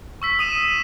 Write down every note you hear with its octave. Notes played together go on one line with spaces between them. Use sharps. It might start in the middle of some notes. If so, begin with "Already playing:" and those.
C#6 E6 B6
D#6 D#7 E7